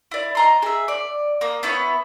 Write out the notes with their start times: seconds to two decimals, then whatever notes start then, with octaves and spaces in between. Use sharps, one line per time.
0.11 E4 D5
0.35 D#5 A#5 C6
0.62 G#4 E5
0.88 D5
1.41 A#3 D#6
1.63 B3 E4 C#5